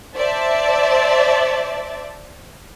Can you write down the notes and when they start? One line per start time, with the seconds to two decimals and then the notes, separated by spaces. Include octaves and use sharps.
0.16 C5 D5 E5 A5